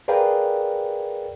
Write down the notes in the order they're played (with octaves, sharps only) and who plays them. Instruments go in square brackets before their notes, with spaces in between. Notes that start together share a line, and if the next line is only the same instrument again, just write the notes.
[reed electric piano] G#4 A#4 B4 D5 F5 G5